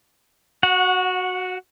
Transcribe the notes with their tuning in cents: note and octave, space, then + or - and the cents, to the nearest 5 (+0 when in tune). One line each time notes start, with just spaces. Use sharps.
F#4 +0 F#5 -25